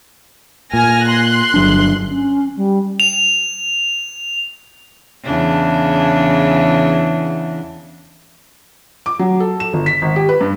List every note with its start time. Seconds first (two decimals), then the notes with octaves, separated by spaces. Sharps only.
0.73 A#2 G#5 F6 A#6
1.07 C6 F#6
1.54 G1 F#3 D4
2.09 C#4
2.57 G3
3.00 F7
5.24 E2 C#3 D4
9.06 D6
9.19 F#3
9.40 A4
9.60 E7
9.74 G1
9.86 B6
10.02 G#1
10.16 G4
10.29 B4
10.41 G2